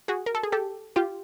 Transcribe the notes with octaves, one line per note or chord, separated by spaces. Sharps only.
F#4 G#4
A#4
A4
G#4
G4 A4
F4 G4